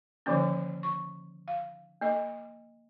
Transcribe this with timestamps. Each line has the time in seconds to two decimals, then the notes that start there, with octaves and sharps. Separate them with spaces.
0.26 D3 D#3 F3 A#3 C#4
0.83 C#6
1.48 F5
2.01 A#3 D#5